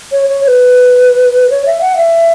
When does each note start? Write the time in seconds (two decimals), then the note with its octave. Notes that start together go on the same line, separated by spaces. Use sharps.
0.12 C#5
0.28 C#5
0.44 C#5
0.48 B4
1.50 C#5
1.66 E5
1.81 F#5
1.96 E5